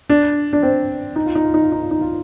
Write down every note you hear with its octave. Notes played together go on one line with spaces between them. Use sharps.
D4
D4
C4
D#4
F4
D#4
F4
D#4
F4
D#4
F4
D#4
F4